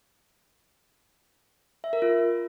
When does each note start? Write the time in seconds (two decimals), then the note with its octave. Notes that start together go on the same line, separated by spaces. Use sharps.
1.84 E5
1.93 A#4
2.02 F4